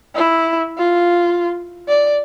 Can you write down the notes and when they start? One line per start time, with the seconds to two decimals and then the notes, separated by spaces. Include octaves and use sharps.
0.15 E4
0.78 F4
1.88 D5